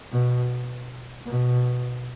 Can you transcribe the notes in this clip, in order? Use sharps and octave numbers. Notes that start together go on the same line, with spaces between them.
B2
B2